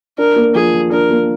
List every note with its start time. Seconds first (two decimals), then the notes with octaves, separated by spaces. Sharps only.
0.18 D4 A#4
0.36 A#3
0.55 F3 G#4
0.73 F3
0.92 D4 A#4
1.11 A#3